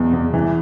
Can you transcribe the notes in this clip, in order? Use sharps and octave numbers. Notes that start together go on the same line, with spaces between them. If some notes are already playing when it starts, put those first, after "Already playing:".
Already playing: E2 B2
E2
E3